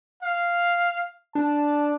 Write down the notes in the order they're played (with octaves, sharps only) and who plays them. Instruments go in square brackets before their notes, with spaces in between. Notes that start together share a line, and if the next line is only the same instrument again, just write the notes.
[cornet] F5
[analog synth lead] D4 [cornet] A5